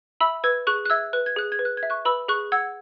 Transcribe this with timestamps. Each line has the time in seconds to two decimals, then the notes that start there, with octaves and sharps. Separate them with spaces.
0.21 E5 B5 E6
0.44 B4 E6 G#6
0.67 G#4 C#6 F#6
0.86 F#6
0.90 E5 E6 G#6
1.13 B4 F#6
1.26 G#6
1.36 G#4 F#6
1.52 G#6
1.59 B4
1.65 F#6
1.77 G#6
1.83 E5
1.90 C#6 F#6
2.05 B4 B5 E6
2.28 G#4 C#6 F#6
2.52 F#5 E6 G#6